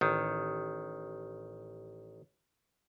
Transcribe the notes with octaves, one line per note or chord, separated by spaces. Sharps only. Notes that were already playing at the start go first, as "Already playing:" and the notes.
A1 D#3